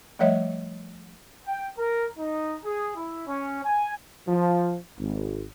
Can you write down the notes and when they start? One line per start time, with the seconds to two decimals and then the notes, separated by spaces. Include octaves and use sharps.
0.19 F3 G3 A3 C#5 D#5 E5
1.46 G5
1.78 A#4
2.18 D#4
2.65 G#4
2.96 E4
3.27 C#4
3.64 G#5
4.27 F3
4.98 G#1